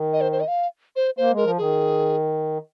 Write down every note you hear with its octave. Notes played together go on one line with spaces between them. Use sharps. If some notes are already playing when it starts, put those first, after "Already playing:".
Already playing: D#3
D#5
C5
C5
D#5
F5
C5
A#3 C5
G#3
A#4
F3
D#3 G#4